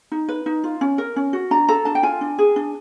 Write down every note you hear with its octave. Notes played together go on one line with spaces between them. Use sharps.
D#4
B4
D#4
F4
C#4
A#4
C#4
F#4
D4 A#5
A4 A#5
D4 A5
G5
F4 G#5
D4
G#4
D4